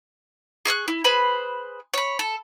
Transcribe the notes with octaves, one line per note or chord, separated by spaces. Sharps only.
G#4 C#6 F6 F#6
E4
G#4 B4 C5 B5
C#5 B5
A4